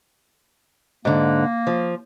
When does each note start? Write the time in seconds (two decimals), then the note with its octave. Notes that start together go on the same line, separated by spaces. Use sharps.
1.05 G#2 D3 A#3
1.67 F3